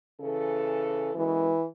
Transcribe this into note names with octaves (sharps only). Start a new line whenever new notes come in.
C#3 E3 A4
F#2 B2 E3 G#3